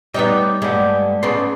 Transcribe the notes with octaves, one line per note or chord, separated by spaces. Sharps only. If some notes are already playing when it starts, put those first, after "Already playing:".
G3 B3 D#4 C#5 G5 D6
G2 D3 G#3 B3 G4
G#2 C#3 B3 D5 C6